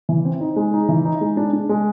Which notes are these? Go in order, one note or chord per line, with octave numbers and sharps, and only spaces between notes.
E3
C4
D#4
G#3
D#4
E3
D#4
G#3
D4
D4
G#3